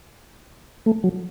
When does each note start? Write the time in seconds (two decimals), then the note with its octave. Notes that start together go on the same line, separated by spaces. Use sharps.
0.86 A3
1.04 F#3